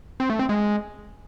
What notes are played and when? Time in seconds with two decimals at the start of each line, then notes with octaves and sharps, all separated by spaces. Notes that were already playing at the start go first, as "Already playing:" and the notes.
0.20 C4
0.30 A3
0.39 C4
0.49 G#3